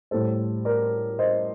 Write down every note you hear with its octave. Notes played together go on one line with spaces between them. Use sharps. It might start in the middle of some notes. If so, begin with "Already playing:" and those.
A2 G3 A4 C5
A#4 D5
C5 D#5